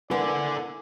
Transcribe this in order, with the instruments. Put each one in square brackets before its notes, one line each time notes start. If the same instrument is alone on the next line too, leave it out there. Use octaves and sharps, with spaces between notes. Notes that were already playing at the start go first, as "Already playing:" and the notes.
[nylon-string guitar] A#3 E4 B4 [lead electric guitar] A4 F#5 [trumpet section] D5 G#5